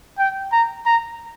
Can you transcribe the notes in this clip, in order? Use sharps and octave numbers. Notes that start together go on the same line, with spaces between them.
G5
A#5
A#5